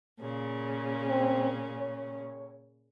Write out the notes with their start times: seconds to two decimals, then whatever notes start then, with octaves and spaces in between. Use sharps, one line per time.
0.19 A#2 C#3 C#4
1.09 C4
1.78 C#5